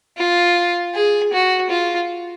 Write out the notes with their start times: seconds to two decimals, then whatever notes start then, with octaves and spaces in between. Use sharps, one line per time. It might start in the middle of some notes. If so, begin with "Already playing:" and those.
0.18 F4
0.95 G#4
1.33 F#4
1.70 F4